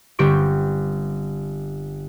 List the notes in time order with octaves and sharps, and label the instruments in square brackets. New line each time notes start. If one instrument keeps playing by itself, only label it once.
[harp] G1 G3 C4 G4 C#6 D7